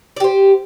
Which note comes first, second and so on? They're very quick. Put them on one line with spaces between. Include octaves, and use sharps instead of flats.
D5 G4 C5